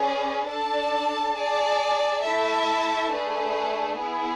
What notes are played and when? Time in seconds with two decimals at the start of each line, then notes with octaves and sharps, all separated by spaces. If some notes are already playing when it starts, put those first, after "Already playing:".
Already playing: C#4 G#4 B4 D5
0.48 D4 A4 D5 A5
1.36 G#4 D5 A5
2.23 A3 E4 A4 E5 A5
3.10 A3 D4 G#4 B4
3.98 B3 E4 G#4